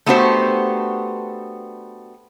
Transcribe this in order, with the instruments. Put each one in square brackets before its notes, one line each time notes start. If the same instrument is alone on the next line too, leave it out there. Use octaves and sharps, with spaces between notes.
[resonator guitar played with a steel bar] A3 B3 D4 F#4 G4 C5